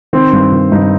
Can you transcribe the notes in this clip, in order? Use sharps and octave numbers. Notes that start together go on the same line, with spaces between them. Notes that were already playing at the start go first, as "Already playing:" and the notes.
D#3 C4
G2
D#3
G2 D#4